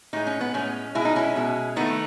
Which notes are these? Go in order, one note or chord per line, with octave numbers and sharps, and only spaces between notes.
A2 G#3 D#4
C#4
B3
A2 G#3 C#4
B2 G#3 E4
D#4
C#4 E4
B2 G#3
D#3 A3 B3 D#4